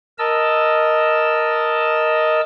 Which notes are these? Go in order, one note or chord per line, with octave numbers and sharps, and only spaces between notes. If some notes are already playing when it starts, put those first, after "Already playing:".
A#4 D#5 A5 E6